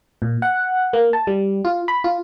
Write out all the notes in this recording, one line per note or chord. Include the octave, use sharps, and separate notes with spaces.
A#2
F#5
A#3
A5
G3
F4
B5
F4